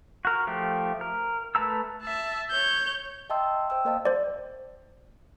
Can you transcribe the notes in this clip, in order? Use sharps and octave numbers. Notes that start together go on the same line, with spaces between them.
F#4 A#4
F3 A3 G4
A#4
A3 B4 A5 A#5 E6
E5 A5
C#5 G6
D#5 E5 G5 A5 C6 E6
C5 G5 E6
A#3 A#4 C5 D#5 F5 A5
C5 D5